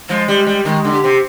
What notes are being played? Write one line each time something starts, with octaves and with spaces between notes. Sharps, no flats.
F3 G#3
G3
G3
D#3 G#3
D3
G4
C3